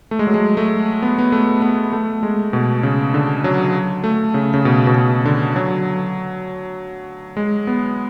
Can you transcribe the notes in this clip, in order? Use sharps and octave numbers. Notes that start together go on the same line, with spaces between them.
A3
G#3
F#3
G#3
A3
B3
B3
A3
B3
A3
G#3
B2
C#3
D3
F#3
A3
C#3
C#3
B2
B2
C#3
D3
F#3
G#3
B3